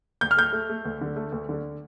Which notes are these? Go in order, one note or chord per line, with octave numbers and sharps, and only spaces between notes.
D2 G6
F6
A3 G6
A3
A3
D2
D3
A3
D2
D3